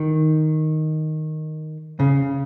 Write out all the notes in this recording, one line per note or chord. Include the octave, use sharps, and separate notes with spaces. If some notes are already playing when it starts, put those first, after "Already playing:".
Already playing: D#3
C#3